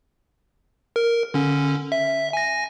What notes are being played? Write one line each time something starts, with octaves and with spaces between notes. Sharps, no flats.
A#4
D3 C#4
E5
G#5 A#6